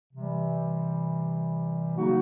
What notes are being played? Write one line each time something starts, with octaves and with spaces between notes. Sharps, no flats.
C3 E3 G3
C#3 F#3 A#3 D#4 F#4